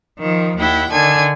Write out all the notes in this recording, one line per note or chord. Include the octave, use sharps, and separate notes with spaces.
D#3 F3
D#2 E4 F#5 G5
D3 D#3 G#5 A5 G#6